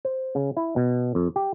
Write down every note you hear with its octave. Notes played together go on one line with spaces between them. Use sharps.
C5
C#3
E4
B2
F2
G4